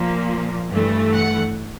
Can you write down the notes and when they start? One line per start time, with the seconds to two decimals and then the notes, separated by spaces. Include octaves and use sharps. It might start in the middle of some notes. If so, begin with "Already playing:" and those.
Already playing: A#2 F3 A#3
0.71 G2 E3 A3
1.12 F#5